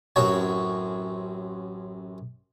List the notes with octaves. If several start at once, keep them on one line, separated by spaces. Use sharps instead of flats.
A1 F#2 C4 F#4 C#5